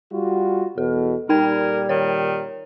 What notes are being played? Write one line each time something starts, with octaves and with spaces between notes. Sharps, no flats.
G3 F4 F#4
E2 B2 A4
A#2 G3 D#4 A#4 G5 G#6
D#3 C#5